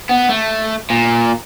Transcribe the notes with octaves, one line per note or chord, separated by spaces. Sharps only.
B3
A3
A#2